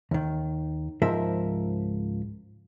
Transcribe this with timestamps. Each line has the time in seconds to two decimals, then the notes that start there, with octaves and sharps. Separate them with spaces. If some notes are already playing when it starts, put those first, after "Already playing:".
0.11 D#2 D#3
1.02 C#2 G#2 F3 A#4 E5